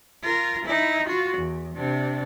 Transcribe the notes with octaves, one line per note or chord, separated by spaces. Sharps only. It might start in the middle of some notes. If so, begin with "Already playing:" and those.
F4 A#4
D#4 E4
F4 F#4
E2
C3 D4